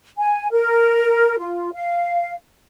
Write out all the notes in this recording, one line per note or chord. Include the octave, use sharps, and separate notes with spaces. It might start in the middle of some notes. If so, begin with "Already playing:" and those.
G#5
A#4
F4
F5